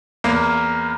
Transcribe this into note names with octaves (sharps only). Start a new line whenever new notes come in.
E2 A#3 A#4